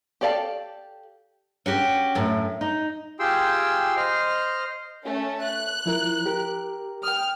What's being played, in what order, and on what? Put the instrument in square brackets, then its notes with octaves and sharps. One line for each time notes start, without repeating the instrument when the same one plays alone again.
[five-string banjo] G4 A4 D5 F5 A5
[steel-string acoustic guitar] C#4 F#4 G4
F#2 A2
D#4
[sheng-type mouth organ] F4 G4 G#4 G5 C6 E6
C5 D#5 F6
[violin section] A3 C#4
F#6
[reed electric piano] F3 E4 A#4
G4 A#4
[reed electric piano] G5 D#6 [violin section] F6